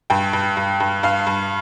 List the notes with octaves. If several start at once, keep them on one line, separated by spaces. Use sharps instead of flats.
G2 G5
G2
G2
G2
G2 F5
G2